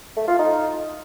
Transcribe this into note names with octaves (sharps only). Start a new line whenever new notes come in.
A3
F4
D#4